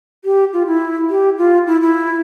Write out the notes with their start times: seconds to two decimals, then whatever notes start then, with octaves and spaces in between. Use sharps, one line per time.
0.25 G4
0.53 F4
0.67 E4
1.10 G4
1.38 F4
1.67 E4
1.81 E4